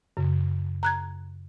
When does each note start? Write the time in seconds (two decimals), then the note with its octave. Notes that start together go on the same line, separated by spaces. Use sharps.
0.17 F#2 C#3
0.83 A#5 F#6 G#6